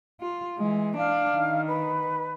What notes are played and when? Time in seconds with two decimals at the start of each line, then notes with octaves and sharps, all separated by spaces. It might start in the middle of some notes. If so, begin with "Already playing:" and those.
0.21 F4
0.58 E3 G#3
0.97 D4 F5
1.34 D#3
1.67 B4